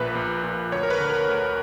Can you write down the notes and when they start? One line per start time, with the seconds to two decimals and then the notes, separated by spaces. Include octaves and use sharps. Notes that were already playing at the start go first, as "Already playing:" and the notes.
Already playing: A#1 A#2 B4
0.15 A#1
0.44 A#2
0.72 D2 C#5
0.83 A#4
0.90 B4
1.00 D3
1.10 A#4
1.29 D2